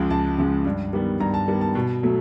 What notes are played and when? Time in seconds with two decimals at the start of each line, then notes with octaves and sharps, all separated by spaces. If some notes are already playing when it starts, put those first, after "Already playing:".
Already playing: C#2 C#3 F3 G#3
0.10 C#2 A5
0.38 C#3 F3 G#3
0.65 G2
0.93 D#3 G3 B3
1.20 G2 A#5
1.34 A5
1.47 D#3 G3 B3
1.61 A5
1.75 B2
2.03 F#3 A3